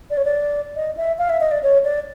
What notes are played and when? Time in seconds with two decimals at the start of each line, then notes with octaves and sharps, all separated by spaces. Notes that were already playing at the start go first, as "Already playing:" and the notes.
0.10 D5
0.17 C#5
0.25 D5
0.76 D#5
0.97 E5
1.18 F5
1.29 E5
1.41 D#5
1.51 D5
1.63 C#5
1.84 D5